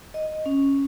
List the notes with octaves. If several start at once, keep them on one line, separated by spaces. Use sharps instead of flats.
D#5
C#4